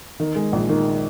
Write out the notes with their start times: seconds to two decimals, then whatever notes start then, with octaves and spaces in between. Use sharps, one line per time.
0.20 D#3
0.36 G#3
0.52 A#1
0.69 D#3